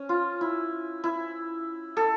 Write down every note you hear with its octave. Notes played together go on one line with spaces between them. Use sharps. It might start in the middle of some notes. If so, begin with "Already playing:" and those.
Already playing: C#4
F4
E4
E4
A4